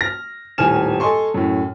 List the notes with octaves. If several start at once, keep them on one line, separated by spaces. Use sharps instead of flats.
F6 A#6
D#1 A2 D#3 G#5 F6 E7
A4 D#5 G#5 C6 C#6
F#2 A2